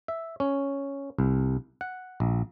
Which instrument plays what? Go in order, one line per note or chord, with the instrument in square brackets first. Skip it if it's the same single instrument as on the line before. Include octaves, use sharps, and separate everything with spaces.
[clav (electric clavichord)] E5
C#4
C2
F#5
A#1